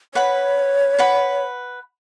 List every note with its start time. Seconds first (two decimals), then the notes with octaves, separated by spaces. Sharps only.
0.15 B4 C#5 F#5 B5
0.99 B4 F#5 B5